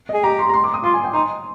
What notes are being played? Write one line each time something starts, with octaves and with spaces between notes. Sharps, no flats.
D#5
G#4
G4 A#5
C6
A#5
C6
D6
D#6
F4 C6
G#5
G5
D#4 C6